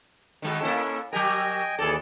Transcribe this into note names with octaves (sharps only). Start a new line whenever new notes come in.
D#3 G#3 F#4
A#3 C#4 E4 A4
F#3 G4 A#4 D#5 G5 G#5
D#2 E3 G#4 A4 D5